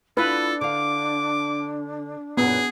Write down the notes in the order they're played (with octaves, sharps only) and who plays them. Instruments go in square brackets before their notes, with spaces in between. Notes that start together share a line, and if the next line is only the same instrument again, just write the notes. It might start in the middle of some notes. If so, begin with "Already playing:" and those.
[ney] D4 [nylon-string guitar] E4 F4 [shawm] A4 [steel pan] B4
[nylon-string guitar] D3 F5 [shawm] D6
[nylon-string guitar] F#2 A#2 [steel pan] B3 [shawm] G#4